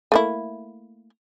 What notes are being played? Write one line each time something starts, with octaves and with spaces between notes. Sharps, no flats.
A3 A#3 E4